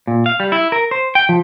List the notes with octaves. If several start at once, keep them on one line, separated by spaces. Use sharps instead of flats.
A#2
F5
G3
E4
A#4
C5
G5
F3